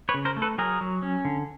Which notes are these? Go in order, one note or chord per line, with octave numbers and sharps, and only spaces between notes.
B4 C#5
C#3
A#4 C5
A3
A4 B4
F#3 G#4 A#4
F#3
C#4
D3